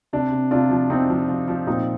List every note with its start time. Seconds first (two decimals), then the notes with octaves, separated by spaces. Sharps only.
0.13 C3 D4
0.32 C3
0.51 C3 D4 F4
0.71 F3
0.90 C3 C4 D#4
1.10 F3
1.28 F3
1.48 F3
1.67 A#2 C4 D#4